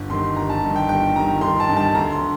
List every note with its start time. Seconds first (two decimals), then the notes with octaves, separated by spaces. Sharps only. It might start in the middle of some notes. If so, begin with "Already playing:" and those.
Already playing: G1
0.10 G2 D#3 C6
0.36 G1 A#5
0.49 A5
0.63 G2 D#3
0.76 G5
0.89 G1 G5
1.15 G2 A#5
1.19 D#3
1.41 G1 C6
1.60 A5
1.69 G2 D#3
1.77 A5
1.94 D2 A#5
2.12 C6
2.21 D3